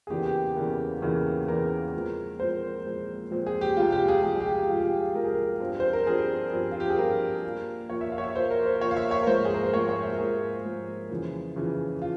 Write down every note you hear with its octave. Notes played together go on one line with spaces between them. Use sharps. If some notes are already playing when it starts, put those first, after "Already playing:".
G#4
E2 C#3 E3 A#3 G4
G4
E2 C#3 E3 A#3
E2 C#3 E3 A#3
E2 C#3 E3 A#3 A#4
A#2 F3 G#3 C4
A#2 F3 G#3 C4 C5
A#2 F3 G#3 C4
A#2 F3 G#3 C4
G#4
G4
C2 C3 F3 G#3 F4
G4
G#4
C2 C3 F3 G#3 G#4
G4
G#4
C2 C3 F3 G#3 F4
F4
G4
G#4
C2 C3 F3 G#3 A#4
G#4
A#4
G2 F3 C4
C5
A#4
G2 F3 C4 G#4
G2 F3 C4
F4
G4
G#4
G2 F3 C4 A#4
A#2 F3 A#3
A#2 F3 A#3 C#5
E5
F5
C#5
E5
A#2 F3 A#3 C5
A#4
C5
A#2 F3 A#3 C#5
F5
E5
C#5
A#4
G#2 F3 A#3 C5
G#4
A#4
C5
G#2 F3 A#3 C#5
C#5
E5
A#4
G#2 F3 A#3 G#4
G#2 F3 A#3
F2 C#3 E3
F2 C#3 E3
F4